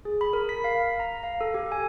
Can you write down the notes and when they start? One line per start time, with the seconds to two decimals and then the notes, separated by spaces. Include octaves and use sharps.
0.05 G#4
0.21 B5
0.33 A#4
0.49 B6
0.64 F5
1.00 A#5
1.23 F5
1.41 A4
1.54 G4
1.72 G#5